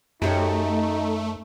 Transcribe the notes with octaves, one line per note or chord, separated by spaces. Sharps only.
F#2 A3 D#4 F#4 G4 C#5